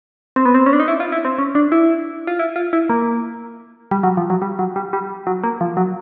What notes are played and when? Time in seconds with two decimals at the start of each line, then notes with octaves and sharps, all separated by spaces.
0.36 C4
0.45 B3
0.54 C4
0.66 C#4
0.73 D4
0.80 D#4
0.88 E4
1.00 F4
1.12 E4
1.25 C4
1.38 C#4
1.55 D4
1.72 E4
2.27 F4
2.39 E4
2.56 F4
2.73 E4
2.90 A#3
3.91 G3
4.03 F#3
4.17 F3
4.30 F#3
4.42 G3
4.59 F#3
4.76 G3
4.93 G3
5.27 F#3
5.43 A#3
5.61 F3
5.77 F#3